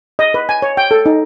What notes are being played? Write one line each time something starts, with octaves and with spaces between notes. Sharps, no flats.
D#5
B4
G#5
C#5
G5
A4
D#4